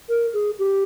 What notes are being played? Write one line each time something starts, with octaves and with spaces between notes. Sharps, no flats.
A#4
G#4
G4